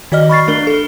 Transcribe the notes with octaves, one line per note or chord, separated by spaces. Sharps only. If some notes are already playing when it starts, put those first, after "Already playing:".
D#3 F#4 D5 D#5 F6
B5 C#6 A6 C7
A3 D4 A#4 C7 G7
A4 G7